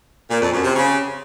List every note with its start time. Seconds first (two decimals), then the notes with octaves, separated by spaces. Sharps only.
0.30 A#2
0.41 F2
0.53 F#2
0.64 C3
0.76 C#3